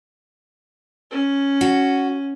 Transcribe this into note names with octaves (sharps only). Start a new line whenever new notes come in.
C#4
F#4